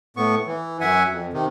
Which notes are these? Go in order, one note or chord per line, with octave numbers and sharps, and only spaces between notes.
A2 B3 C#6
E3
F#2 E5 F#5 G#5
F2
C3 D#3